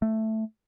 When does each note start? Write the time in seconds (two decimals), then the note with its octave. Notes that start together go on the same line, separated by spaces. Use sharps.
0.02 A3